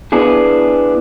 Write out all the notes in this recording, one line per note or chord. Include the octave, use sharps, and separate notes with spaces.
B3 D4 E4 G#4